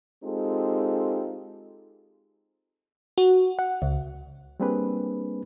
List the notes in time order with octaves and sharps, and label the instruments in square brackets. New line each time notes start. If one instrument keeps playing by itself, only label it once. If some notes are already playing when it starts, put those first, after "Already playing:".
[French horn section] G#3 C4 D#4 F4 G4 A4
[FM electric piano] F#4
F#5
C#2
[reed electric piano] G3 A#3 C4 D4 G#4 B4